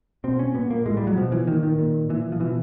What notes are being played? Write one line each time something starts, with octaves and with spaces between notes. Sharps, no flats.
B2 C4
C#4
A#2 B3
A#3
A2 G#3
G3
F#3
B2 F3
E3
A#2 D#3
D#3
A#2
A#2 E3
F3
B2 E3